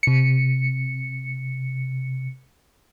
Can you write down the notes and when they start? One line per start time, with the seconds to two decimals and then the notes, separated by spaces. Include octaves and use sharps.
0.03 C3 C#7